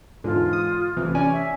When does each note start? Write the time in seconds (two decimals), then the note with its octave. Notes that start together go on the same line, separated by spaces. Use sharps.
0.24 E2 G#2 D3 F4
0.53 D#6
0.97 A1 C3 E3
1.15 C#4 D5 G#5
1.32 E5